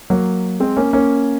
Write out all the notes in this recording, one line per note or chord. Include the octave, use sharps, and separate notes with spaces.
F#3 A#3
G#3 C4
A#3 C#4
A#3 C#4